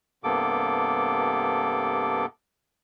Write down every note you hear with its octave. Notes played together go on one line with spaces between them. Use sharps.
G2 C3 A#3 B3 A4 D6